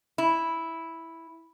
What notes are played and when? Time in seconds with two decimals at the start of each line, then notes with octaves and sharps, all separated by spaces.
0.18 E4